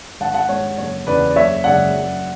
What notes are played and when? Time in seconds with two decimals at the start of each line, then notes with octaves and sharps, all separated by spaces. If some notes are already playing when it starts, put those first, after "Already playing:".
0.20 G#1 F#5 A5
0.34 F#5 A5
0.49 G#2 G#3 C#5
0.78 F#1 C#5
1.07 E2 C#3 B4 D5
1.30 D5
1.36 F#1 C#5 E5
1.64 F#2 C#3 G#3 D5 F#5
1.93 F#2